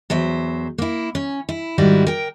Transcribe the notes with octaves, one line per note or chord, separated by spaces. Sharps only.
E2 F#3 C5 E5
A#3 E4
C#4
E4
G#2 D#3 G3 E4 F#4
A#4 G5